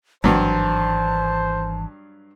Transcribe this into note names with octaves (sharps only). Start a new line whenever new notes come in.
G#1 G2 E3 F#3 C5 A5